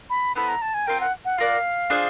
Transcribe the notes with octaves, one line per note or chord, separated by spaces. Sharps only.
B5
B3 E4 A4 C5 B5
A#5
A5
G#5
C4 F4 A#4 G5
F#5
F#5
F4 A#4 D5 F5 F#5
D4 F4 G#4 C5